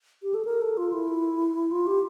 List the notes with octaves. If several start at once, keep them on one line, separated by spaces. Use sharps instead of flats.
G4
A4
A#4
A4
F4
E4
F4
G4